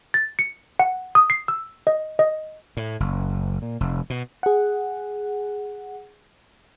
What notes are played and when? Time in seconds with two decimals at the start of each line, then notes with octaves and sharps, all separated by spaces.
0.14 A6
0.39 C#7
0.79 F#5
1.15 D#6
1.30 C7
1.48 E6
1.87 D#5
2.19 D#5
2.77 A2
3.00 F#1
3.62 A#2
3.80 F1
4.10 B2
4.43 G#4 F#5